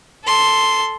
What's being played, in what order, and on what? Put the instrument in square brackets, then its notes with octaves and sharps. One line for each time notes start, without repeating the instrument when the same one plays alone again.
[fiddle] A4 C6